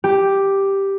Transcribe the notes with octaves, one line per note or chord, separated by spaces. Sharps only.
G4